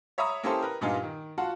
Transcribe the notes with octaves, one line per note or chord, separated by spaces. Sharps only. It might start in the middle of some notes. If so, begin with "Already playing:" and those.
C#5 E5 A#5 B5 D#6
A#3 C#4 E4 G4 A4 C5
A#4 B4
G2 A#2 B3 D#4 F4 G#5
D#3
F4 F#4 F#5 A5